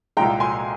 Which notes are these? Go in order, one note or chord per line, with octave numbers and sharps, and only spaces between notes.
C2 A#2 G#3 G5 A#5
G#5 C6